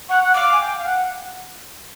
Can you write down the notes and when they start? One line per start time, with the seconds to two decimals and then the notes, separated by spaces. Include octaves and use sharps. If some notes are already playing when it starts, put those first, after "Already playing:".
0.09 F#5 C#6
0.24 F#5
0.34 F5 D6
0.52 G#5
0.60 G5
0.78 F5
0.85 F#5